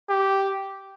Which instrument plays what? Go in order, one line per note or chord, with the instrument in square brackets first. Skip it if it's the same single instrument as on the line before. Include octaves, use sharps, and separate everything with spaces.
[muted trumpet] G4